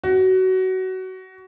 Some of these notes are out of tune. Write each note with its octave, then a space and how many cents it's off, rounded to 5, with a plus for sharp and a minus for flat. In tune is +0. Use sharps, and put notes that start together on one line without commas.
F#4 +20